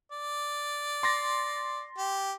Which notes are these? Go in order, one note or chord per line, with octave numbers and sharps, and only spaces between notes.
D5
C6 A6 A#6
G4